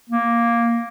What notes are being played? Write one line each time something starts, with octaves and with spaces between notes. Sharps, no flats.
A#3